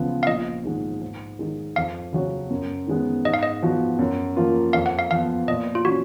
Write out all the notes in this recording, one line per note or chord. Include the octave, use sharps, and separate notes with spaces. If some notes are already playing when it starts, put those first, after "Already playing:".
Already playing: C#2 C#3 F3 B3
F5
A#1 D#5
G#2 D#3 G#3 D#4
G#2
D#3 G#3 D#4
F2 F5
C#3 F#3 C#4 F#4
F#2
D#3 G#3 B3
G#2 D#5
F5
D#5
F3 B3 F#4
F#2
F3 A#3 F4
F2 F5
F#5
F5
F3 B3 F5
A#2 D#5
F4
F#3 C#4 F#4